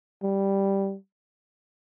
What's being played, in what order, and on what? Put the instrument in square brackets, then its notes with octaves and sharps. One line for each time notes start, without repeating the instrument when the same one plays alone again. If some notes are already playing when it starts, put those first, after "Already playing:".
[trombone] G3